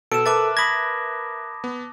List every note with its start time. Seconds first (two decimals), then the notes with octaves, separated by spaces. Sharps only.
0.12 B2 A4 D7 E7
0.26 A#4 B4 E5 A5 D6 A6
0.57 B5 D#6 G#6 A#6
1.64 B3